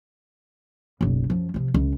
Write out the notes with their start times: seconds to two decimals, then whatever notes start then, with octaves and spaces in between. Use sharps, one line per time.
1.01 F#1 B1
1.30 F#2 F3
1.54 C3 F3
1.74 C#2